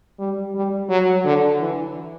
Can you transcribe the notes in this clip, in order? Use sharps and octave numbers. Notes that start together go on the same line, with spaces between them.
G3
G3
F#3
D3
E3